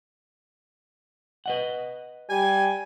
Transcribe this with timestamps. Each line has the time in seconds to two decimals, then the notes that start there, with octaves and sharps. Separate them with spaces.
1.46 B4 D#5 F#5
2.30 G3 G#5